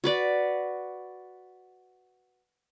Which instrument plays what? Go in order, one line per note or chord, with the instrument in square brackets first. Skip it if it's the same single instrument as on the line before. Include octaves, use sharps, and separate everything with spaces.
[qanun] F#4 B4 D5